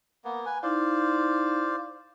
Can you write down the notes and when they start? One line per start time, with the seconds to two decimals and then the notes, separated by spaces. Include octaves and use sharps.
0.25 A#3 B3
0.46 B4 G#5
0.63 D#4 E4 C5 D5 F5